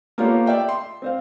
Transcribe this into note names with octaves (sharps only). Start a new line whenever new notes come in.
A#3 B3 F4 G4 A4 C#5
D5 E5 G5
C6
C4 C5 F5